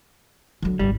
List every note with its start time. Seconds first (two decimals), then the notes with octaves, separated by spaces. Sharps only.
0.62 D3 F#3
0.79 G#1 D#2 G3